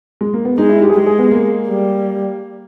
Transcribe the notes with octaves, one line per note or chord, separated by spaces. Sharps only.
G#3
A#3
B3
G#3 D#4
E4
G4
G#4
G#3 G4
G#4
B3
A#3
G3